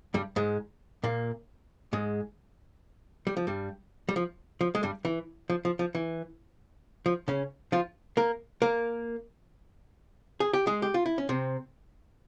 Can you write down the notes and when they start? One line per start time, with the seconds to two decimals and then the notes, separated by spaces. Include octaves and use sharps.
0.14 G2 G3
0.36 G#2 G#3
1.04 A#2 A#3
1.93 G#2 G#3
3.27 G3
3.37 F3
3.47 G2 G3
4.09 G3
4.16 F3
4.61 F3
4.75 G#3
4.83 G2 G3
5.05 E3
5.50 F3
5.65 F3
5.79 F3
5.95 E3
7.06 F3
7.28 C#3 C#4
7.72 F3 F4
8.17 A#3 A#4
8.62 A#3 A#4
10.40 G#4
10.53 G4
10.67 G#3 G#4
10.82 G4
10.94 F4
11.06 E4
11.18 C#4
11.29 C3 C4